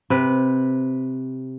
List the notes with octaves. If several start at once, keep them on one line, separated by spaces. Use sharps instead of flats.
C3 B4